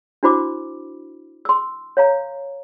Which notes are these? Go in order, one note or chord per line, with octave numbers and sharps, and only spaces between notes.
D4 E4 F#4 C5 B5 D6
C6 E6
C#5 F5 A#5